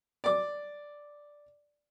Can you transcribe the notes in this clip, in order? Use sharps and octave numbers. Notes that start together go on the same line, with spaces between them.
D5 D6